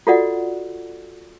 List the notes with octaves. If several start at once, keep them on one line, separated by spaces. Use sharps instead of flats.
F4 F#4 A4 D5 D#5 F#5